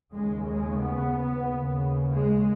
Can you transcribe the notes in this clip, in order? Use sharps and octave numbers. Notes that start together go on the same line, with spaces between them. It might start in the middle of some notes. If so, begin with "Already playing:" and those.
D#2 C#3 G#3
G#3
B3
D#2 C#3
G#3